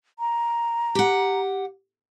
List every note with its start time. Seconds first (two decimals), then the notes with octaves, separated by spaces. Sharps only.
0.19 A#5
0.95 G4 F#5